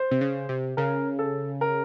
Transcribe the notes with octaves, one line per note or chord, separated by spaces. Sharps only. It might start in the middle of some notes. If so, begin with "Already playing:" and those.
Already playing: C5
C3
C#3
C3
C#3 A#4
A4
A#4